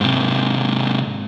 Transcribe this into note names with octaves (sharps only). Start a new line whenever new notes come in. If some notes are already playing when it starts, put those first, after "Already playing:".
G#2 C3